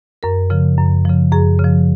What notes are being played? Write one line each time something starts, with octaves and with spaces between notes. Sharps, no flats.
F#2 A#4
C#3 F3
F#2
C#3 F3
F#2 G#4
C#3
F3